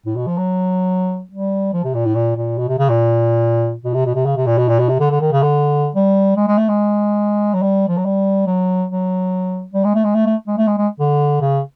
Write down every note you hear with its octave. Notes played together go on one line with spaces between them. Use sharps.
A2
B2
F3
F#3
G3
F3
C3
A#2
A2
A#2
A#2
B2
C3
C#3
A#2
B2
C3
B2
C3
C#3
C3
A#2
B2
A#2
B2
C3
D3
D3
D#3
C#3
D3
G3
G#3
G#3
A3
G#3
F#3
G3
F3
F#3
G3
F#3
F#3
G3
G#3
A3
G#3
A3
A3
G#3
A3
G#3
G#3
D3
C#3